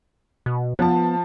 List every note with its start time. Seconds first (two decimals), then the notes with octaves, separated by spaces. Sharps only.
0.46 B2
0.79 F3 B3 A5